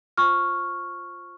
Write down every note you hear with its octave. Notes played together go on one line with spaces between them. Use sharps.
F4 C5 C#6 F6